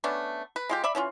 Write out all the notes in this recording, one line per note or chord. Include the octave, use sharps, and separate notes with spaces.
A3 B3 C#4 D4
B4
G#3 F4 G4
D5 E5 B5
E3 C#4 D4 F4